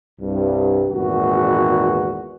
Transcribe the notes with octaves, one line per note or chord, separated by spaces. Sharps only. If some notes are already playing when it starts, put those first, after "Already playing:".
C2 G2
G#1 E2 A#2 B3 F#4